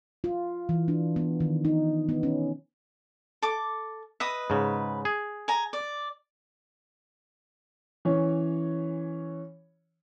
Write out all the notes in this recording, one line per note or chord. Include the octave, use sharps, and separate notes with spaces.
F4
E3
D4
B3
D#3
D#4
B3
C#4
A4 D6
B4 D#5 E5 D#6
G#2 C#3
G#4
G#5 A#5
D5
E3 C#4 C#5